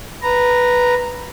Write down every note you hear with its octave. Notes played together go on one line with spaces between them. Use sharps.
B4 A#5